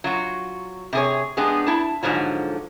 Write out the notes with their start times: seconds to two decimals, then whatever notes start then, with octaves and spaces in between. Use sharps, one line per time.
0.04 F#3 F4 F#4
0.93 C3 G#4 C#5
1.37 G#3 B3 D4 G4 G#4
1.67 E4 A5
2.03 G#2 D3 F3 F#3